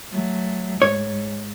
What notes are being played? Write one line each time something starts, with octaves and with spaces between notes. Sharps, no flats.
F#3 A3
G#2 C#5